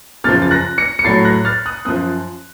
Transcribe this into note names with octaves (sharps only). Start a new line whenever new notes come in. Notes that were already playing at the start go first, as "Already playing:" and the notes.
F#2 C#3 F3 F6 A6
A6
F#6 A#6
A#6 C#7
C#7
A2 F#3 A6 C7
F#6 A#6
F6 A6
D#6 F#6
F#2 F3 D#6 F#6